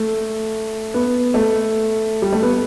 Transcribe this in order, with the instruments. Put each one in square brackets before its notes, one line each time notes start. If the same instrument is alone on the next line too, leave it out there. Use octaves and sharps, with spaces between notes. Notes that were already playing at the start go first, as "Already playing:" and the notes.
Already playing: [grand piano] A3
B3
A3
G3
A3
B3